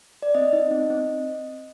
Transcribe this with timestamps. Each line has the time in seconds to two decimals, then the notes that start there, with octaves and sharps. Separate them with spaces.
0.22 D5
0.35 C4 D#5
0.53 D#4
0.71 C4
0.90 C4